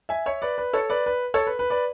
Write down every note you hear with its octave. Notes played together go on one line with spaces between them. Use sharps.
E5 G#5
C#5 E5
B4 D5
B4
A4 C#5
B4 D5
B4
A4 C#5
B4
B4
B4 D5